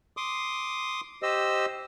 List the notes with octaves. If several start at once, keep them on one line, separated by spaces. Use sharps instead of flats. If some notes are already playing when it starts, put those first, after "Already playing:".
C6 D6 D#6
G4 C5 D#5 E6